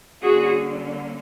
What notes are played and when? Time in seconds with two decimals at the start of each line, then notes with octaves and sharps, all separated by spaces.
0.23 D3 G3 A#3 C#4 F#4 G#4